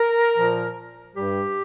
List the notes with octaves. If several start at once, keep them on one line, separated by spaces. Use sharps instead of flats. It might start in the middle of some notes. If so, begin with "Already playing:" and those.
Already playing: A#4
A#2 F3
G2 G3 G4